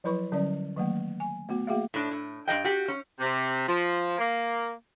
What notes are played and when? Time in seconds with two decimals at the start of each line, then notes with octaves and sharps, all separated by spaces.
0.04 F3 F#3 E4 B4 B5 C#6
0.32 D3 F#3 G3 C#4 D5
0.76 D#3 F#3 A3 A#3
1.20 G#5
1.49 A3 B3 F#4
1.67 A3 A#3 F#4 G#4 E5 F5
1.94 A2 D4
2.11 A2
2.48 G2 F3 D#5 G5
2.64 F#4 G4
2.88 C#4
3.20 C3
3.67 F3
4.18 A#3